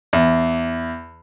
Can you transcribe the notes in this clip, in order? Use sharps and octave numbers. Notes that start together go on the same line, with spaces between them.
E2